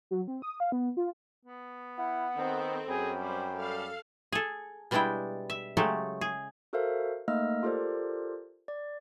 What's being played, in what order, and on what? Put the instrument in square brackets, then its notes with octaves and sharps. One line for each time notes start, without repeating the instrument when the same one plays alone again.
[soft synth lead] F#3
C4
D#6
F5
B3
F4
[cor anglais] B3
[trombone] E4 [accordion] F#5
[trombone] D#3 [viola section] C4 A4
[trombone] F#2 [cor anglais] G#4 [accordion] G5 B5
[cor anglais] G3 [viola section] C5
[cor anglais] G3 [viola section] A4 F5
[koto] G#4 A4
B2 G3 G#3 D4 E4 G5
E5
C#3 F#3 G#3 A3 G4 A4
G#4
[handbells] F#4 A4 A#4 C5 E5 F5
A3 A#3 D#4 D#5 E6 F6
F4 G4 A4 A#4 C5 D5
D5